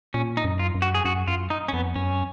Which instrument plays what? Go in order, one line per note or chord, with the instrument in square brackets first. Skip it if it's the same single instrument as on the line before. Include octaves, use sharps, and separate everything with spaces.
[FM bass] A#2 [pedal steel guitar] C#4
[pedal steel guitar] D#4
[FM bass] F#2
[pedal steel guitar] F4
[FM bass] F#2
[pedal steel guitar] F#4
G#4
[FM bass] F#2 [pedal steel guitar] F#4
[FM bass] F#2 [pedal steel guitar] F4
[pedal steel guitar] D#4
C#4
[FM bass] F2 [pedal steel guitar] B3
[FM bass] F#2 [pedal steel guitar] C#4